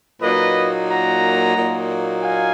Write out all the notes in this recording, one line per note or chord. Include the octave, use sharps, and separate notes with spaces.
A#2 F#3 A#3 D#4 B4 D#5
F#5 A#5
A#2 F#3 A#3 D#4
F5 G#5